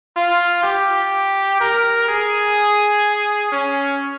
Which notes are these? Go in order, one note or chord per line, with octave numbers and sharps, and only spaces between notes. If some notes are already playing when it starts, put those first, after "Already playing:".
F4
G4
A#4
G#4
C#4